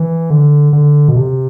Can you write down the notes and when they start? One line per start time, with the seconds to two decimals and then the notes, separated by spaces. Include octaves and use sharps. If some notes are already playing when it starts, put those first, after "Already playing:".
Already playing: E3
0.30 D3
0.73 D3
1.08 B2
1.16 C3